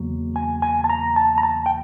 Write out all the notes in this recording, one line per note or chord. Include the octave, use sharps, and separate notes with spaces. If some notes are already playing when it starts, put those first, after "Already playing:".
Already playing: E2 C#3 F#3 A#3
G#5
G#5
A5
A#5
A5
A#5
A5
G5